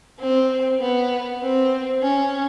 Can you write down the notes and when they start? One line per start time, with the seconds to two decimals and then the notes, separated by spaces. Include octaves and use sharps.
0.20 C4
0.80 B3
1.42 C4
2.02 C#4